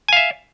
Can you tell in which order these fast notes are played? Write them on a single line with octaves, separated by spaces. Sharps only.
G#5 F5 E5